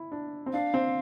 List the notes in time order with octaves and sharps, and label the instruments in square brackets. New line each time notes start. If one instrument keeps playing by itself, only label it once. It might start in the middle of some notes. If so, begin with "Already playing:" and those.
Already playing: [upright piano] E4
D4
C4
[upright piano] D4 [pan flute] F5
[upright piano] C4